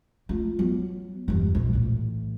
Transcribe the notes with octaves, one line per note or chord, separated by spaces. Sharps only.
A3 F4
F#3 B3
E2 G2
A#1
A2 E3